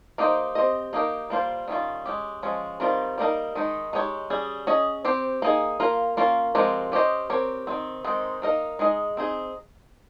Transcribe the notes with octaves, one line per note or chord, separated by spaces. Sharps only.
A#3 D#4 G4 C5 D#5
C4 G4 C5 D#5
A#3 D#4 G4 A#4
G3 A#3 F4 C5
D#3 G3 C#4 F4
G#3 C#4 G4
F3 G#3 C#4
D#3 G3 C4 F4 A#4
G3 A#3 D#4 A#4
D#3 G#3 D#4
G#3 D#4 G4 C#5
G3 C#4 G#4
C#4 G#4 D#5
C4 G4 C5
A#3 D#4 G#4
A#3 F4 A#4
A#3 C#4 F4 A#4
F3 G#3 C4 G4 A#4
C#4 G4 C5 D#5
C4 G4 A#4 C#5
D#3 G#3 C4
D#3 G#3 C4 D#4
A#3 D#4 A#4 D#5
G#3 D#4 G#4 D#5
C4 D#4 G#4